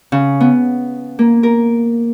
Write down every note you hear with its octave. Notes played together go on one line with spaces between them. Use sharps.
C#3
B3
A#3
A#4